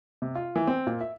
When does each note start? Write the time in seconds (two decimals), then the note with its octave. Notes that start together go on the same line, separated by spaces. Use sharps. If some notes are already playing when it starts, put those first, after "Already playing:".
0.22 C3
0.35 F4
0.56 E3
0.67 C4
0.87 A#2
1.01 E5